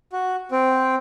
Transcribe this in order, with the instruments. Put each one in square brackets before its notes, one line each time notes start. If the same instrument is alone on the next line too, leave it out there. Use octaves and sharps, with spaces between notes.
[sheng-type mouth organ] F#4
C4